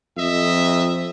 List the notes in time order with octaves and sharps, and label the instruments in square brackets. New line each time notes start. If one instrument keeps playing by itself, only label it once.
[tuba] F2 [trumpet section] D#5 E5